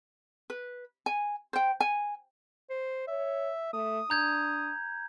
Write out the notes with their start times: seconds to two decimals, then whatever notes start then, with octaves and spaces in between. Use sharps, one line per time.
0.50 B4
1.06 G#5
1.53 C5 G5
1.80 G#5
2.70 C5
3.08 C#5 E5
3.73 A3 D#6
4.10 D4 A#5 G6 G#6